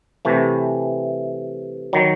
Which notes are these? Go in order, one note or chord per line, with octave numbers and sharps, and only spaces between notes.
C3 E3 A3
D#3 F#3